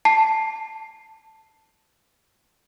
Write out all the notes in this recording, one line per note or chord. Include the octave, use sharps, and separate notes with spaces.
A5 C7